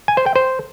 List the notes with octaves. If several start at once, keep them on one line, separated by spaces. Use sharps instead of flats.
G#5
C5
G5
C5